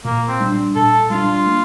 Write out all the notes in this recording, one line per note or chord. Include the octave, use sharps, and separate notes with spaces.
A#2 A#3
C4
G3 D4
A#2 A4
G3 D4 F4
A#3